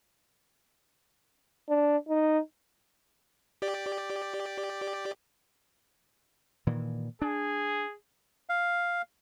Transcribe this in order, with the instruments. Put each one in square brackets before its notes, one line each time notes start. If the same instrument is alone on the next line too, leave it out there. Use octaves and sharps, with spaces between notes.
[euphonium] D4
D#4
[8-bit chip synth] G4 D5
[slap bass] A#2 D#3 E3
[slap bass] D4 [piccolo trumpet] G#4
[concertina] F5